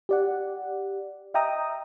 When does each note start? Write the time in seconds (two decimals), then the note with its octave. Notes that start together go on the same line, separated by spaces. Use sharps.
0.09 G4 D5 F#5
1.34 D#5 E5 G5 A#5 D#6